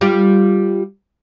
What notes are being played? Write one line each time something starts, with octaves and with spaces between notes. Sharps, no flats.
G3 F4 G4